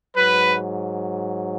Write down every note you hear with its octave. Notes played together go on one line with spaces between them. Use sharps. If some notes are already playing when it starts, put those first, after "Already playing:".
G#2 F#3 B4